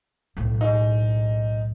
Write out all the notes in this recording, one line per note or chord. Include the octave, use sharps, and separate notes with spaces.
B1 A2
D#4